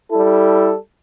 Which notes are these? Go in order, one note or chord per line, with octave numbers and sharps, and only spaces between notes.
G3 E4 A4